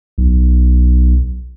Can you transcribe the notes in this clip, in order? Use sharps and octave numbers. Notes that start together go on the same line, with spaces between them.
B1